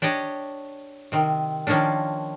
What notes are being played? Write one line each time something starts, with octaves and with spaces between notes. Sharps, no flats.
D4 G4 C#5 D#5
C3 D#3
D#3 F3 A#3 C#4 D4